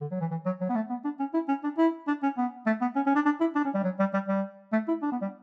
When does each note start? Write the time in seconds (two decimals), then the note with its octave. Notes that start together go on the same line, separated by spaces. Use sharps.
0.01 D3
0.11 F#3
0.21 E3
0.31 E3
0.45 F#3
0.61 F#3
0.69 B3
0.75 A3
0.90 B3
1.04 D4
1.19 C#4
1.34 E4
1.48 C#4
1.64 D4
1.78 E4
2.07 D4
2.23 C#4
2.37 B3
2.66 A3
2.81 B3
2.96 C#4
3.06 C#4
3.15 D4
3.25 D4
3.40 E4
3.55 D4
3.65 C#4
3.74 G3
3.84 F#3
3.99 G3
4.14 G3
4.28 G3
4.72 A3
4.88 E4
5.02 D4
5.12 B3
5.22 G3